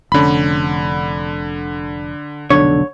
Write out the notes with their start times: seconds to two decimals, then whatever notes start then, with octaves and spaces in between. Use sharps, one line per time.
0.12 F1 D3 C#4 B5
2.50 F1 B1 D3 D4 C#5